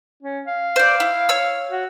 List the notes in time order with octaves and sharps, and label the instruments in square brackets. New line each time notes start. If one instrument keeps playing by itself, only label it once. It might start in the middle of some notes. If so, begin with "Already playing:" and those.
[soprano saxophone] C#4
F5
[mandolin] C5 D5
E4
C#5 E6
[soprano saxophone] F#4